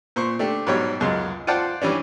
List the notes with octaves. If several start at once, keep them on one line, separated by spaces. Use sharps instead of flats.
A#2 C5 C#6
A3 D4 G4
G#2 B2 F#3 G3 C#5 G5
C#2 F#2 G#3 C6
F4 C5 D5 F#5 G5 A5
E3 G3 C#4 D4